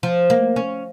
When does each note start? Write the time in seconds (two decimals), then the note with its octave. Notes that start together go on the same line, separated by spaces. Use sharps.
0.03 F3
0.30 A#3
0.56 C#4